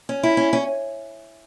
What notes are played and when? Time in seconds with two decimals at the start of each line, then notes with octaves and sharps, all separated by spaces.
0.09 C#4
0.23 E4
0.37 C#4
0.53 C#4